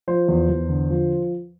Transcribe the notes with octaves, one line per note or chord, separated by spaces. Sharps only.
F3 C5
E2
E2
D3
F3